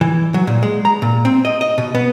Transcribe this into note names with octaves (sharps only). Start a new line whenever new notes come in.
E3
F#3
A#2
G#3
A#5
A#2
C4
D#5
D#5
B2
B3